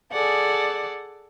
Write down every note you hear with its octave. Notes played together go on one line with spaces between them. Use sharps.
G#4 A4 D5 F#5